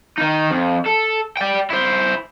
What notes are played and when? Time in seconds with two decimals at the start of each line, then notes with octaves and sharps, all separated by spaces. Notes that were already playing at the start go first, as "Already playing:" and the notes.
0.18 D#3 D#4
0.51 F2
0.86 A4
1.37 D5 G5
1.70 E4 C5